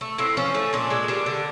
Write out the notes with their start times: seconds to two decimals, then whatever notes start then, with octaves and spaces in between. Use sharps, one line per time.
0.01 A3
0.18 A2 C4
0.37 F3 C#4
0.54 A3
0.73 A#2 D4
0.90 G#3
1.08 G3 D4
1.26 D3